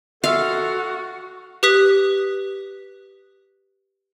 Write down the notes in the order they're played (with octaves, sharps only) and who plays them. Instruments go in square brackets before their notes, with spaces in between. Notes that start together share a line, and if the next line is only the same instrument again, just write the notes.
[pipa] F4 E5 [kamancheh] F#4 [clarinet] A4 [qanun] F5
[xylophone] G4 B4 D#6 F#6 B6